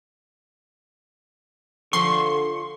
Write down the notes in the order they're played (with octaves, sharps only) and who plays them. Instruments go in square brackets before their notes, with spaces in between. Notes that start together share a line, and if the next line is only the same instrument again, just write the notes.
[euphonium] D3 [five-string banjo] F3 [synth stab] C6 [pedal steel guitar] C#6